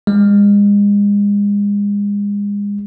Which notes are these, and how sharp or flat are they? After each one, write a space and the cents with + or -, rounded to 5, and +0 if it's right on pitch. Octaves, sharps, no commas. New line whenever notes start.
G#3 -35